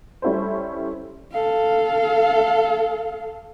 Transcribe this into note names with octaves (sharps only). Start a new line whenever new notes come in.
G3 C#4 E4 A4 C5
A4 F5